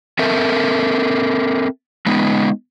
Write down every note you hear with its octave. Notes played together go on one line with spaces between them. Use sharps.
C4 A4 A#4 E5
G#3 B3 D#4